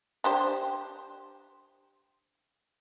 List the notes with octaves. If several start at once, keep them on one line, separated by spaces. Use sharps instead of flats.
D4 G4 C5